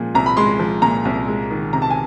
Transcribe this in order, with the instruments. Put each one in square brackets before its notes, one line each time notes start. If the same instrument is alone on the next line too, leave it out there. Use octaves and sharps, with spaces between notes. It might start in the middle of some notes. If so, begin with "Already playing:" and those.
Already playing: [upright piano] A#2 F3 G#3
C2 A#5
B5
G#3 C6
F3
A#2 A#5
C2
G#3
D#3
C3 A#5
A5
G#5